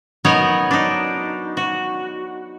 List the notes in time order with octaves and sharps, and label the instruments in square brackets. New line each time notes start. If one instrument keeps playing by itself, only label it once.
[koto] F#3 B3 D#4 A#4 C#5 F#5
D4 D#4
F#4